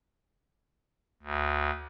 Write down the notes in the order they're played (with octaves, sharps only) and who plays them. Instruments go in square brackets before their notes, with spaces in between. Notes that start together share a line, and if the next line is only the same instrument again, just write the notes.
[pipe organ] D2